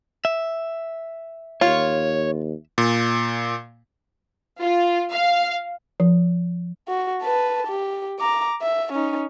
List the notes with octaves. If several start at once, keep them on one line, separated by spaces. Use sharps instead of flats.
E5
D#2 F4 C#5
A#2
F4
F5
F3
F#4
B4 A5
G4
A#5 D6
E5
C#4 D#4